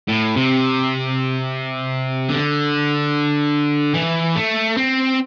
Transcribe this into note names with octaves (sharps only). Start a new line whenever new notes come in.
A2
C3
D3
E3
A3
C4